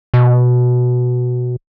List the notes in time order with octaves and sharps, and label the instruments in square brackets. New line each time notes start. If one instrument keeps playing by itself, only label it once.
[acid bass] B2